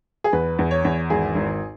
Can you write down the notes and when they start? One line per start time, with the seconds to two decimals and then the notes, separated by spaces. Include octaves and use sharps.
0.24 G#4
0.33 E2 B4
0.59 E2
0.71 C#5
0.85 E2
1.10 G#1 G#4
1.35 G#1